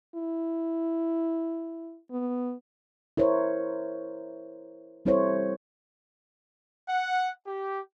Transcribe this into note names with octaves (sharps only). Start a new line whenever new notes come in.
E4
B3
E4 A#4 C5 C#5
G3 C4 E4 A4 C5 C#5
F#5
G4